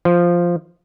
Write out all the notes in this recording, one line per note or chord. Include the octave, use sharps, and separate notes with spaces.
F3